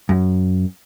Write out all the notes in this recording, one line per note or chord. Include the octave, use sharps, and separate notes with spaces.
F#2